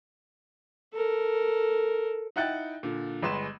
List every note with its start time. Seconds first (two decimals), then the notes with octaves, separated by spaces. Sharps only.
0.93 A4 A#4
2.36 D#4 E4 F#5 G5 F#6 A6
2.83 A#2 D3
3.22 G1 G#3 B4 C6 E7